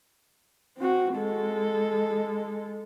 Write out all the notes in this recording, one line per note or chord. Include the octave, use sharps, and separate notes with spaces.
C4 F#4
G#3 A4